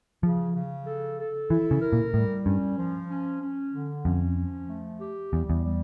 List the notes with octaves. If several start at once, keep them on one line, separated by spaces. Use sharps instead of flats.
C#3 F3
C#3
A4
A4
E3 E4
C#3
A#4
A#2
A2 G3
G2 C#4
F3
C#4
C#4
D3
F2 C#4
F3
A3
G4
E2 G3
E2
G3